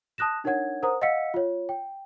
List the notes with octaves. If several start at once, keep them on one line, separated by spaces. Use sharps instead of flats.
A5 D#6 F#6 A#6 E7
D4 D#4 A#4 C#5 F#5 G#6
A#4 C5 F#5 A#5 D#6
D#5 F5 F#5 E6 B6 C#7
F4 C#5
G5